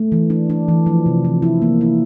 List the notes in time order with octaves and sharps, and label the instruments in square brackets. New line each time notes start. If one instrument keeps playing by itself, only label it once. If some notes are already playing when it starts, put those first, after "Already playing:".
Already playing: [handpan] A3
E3
D4
D4
E3
F3
C3
F3
E4
A#3
E4